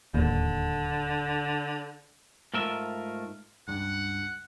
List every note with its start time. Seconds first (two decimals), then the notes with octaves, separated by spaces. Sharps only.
0.14 D1 D#2 D3
2.54 G#2 A3 F4 A#4 E5
3.68 C#2 G2 F#5